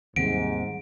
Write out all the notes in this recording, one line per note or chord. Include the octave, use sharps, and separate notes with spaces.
D#2 G#2 C3 F#3 G3 D7